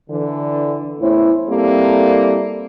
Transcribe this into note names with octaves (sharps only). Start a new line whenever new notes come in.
D3 E3
E2 A2 A3 C#4 E4 C5
G3 A#3 C4 E4 A4